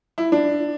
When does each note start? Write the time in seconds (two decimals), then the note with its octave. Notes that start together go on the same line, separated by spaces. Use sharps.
0.18 E4
0.32 D4